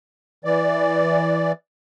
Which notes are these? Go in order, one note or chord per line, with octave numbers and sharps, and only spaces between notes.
E3 D5